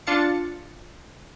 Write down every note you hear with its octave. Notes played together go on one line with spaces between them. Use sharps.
D4 F4 A6 C#7